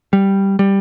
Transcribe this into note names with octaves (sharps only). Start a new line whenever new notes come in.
G3
G3